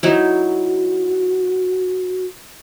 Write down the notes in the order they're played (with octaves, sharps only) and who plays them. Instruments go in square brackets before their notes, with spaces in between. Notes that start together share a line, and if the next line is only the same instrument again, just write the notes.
[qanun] F#3 D#4 E4 [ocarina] F#4